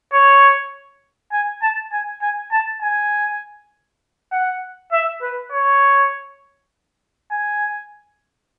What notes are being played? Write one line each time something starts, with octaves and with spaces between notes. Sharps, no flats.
C#5
G#5
A5
G#5
G#5
A5
G#5
F#5
E5
B4
C#5
G#5